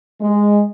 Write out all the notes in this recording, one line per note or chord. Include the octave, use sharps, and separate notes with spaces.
G#3